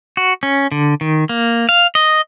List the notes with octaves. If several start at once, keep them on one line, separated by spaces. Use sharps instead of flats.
F#4
C#4
D3
D#3
A#3
F5
D#5